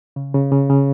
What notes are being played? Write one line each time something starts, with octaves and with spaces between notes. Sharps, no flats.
C#3
C#3
C#3
C#3